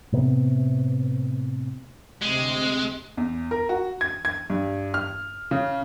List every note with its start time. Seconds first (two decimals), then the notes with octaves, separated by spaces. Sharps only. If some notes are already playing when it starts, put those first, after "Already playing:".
0.12 A2 C3 B3
2.22 D2 C3 G#3
3.17 E2
3.51 A#4
3.69 F#4
4.01 G#6
4.25 G#6
4.50 G2
4.94 F6
5.51 C#3